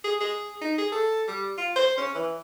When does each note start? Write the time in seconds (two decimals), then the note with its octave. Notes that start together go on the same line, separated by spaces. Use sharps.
0.04 G#4
0.21 G#4
0.61 D#4
0.78 G#4
0.92 A4
1.28 G3
1.58 F4
1.76 C5
1.97 C#4
2.15 E3